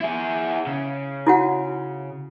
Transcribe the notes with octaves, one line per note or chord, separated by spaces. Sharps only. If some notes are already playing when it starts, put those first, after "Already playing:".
E4 G#4
C#3
E4 F#4 F#5